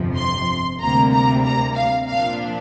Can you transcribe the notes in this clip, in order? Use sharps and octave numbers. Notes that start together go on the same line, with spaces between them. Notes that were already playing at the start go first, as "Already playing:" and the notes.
Already playing: G1 F2 C3 F3
C6
D2 C3 G3 A#3 A#5
A#5
A#5
F5
A#2 F3 D4 F5